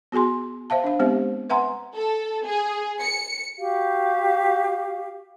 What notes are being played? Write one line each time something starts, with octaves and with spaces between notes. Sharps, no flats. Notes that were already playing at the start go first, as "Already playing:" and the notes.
B3 F#4 G#4 G#5 C6
C5 E5 F5 A5
D4 F5
G#3 B3 C4 G4 C5 E5
B4 E5 F#5 G#5 A#5 C6
A4
G#4
C#7
F#4 G4 F5